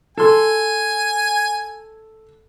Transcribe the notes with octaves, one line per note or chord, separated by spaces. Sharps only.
A4 G#5 C6